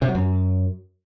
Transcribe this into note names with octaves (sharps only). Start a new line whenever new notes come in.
C3
F#3
F#2